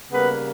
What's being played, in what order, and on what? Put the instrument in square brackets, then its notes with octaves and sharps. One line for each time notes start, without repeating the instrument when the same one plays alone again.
[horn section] C#3 G3 A#3 B3 B4